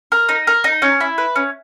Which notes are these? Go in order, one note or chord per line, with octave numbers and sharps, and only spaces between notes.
A#4
D#4
A#4
D#4
C#4
E4
B4
C#4